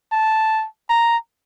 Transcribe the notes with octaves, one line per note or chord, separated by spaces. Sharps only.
A5
A#5